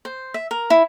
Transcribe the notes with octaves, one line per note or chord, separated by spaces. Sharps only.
C5
E5
A#4
E4